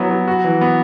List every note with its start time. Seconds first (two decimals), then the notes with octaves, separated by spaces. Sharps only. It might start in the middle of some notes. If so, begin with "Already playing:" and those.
Already playing: F#3 B3 E4
0.10 F#3
0.28 F#4
0.44 E3
0.61 B3